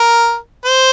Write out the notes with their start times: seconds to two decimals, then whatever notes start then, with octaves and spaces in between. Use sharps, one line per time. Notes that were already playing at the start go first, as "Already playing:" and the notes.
Already playing: A#4
0.65 C5